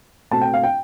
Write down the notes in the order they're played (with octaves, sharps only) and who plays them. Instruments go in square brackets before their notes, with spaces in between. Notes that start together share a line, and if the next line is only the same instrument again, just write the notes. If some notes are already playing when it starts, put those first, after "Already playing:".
[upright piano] B2 A3 C4 A5
G5
F5
G5